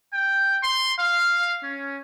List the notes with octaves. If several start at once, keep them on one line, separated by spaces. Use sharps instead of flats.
G5
C6
F5
C#4